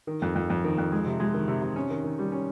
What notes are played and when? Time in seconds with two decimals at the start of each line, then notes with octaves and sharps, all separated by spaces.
0.07 D#3
0.22 F2
0.35 F2
0.50 F2
0.64 D#3
0.78 F2
0.92 G#3
1.06 C3
1.20 G#3
1.34 D#3
1.48 C3
1.62 C3
1.76 C#4
1.90 D#3
2.04 D#3
2.19 G3
2.32 C#4